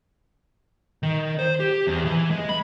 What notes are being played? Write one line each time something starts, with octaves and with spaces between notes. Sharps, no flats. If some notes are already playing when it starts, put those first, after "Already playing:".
D#3
C5
G4
E2
E3
G#3
B5